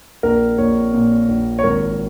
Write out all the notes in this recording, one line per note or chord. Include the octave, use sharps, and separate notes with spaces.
A#1 A#4
A#1 C#5
A#2
A#1
C#5
G#1 A#4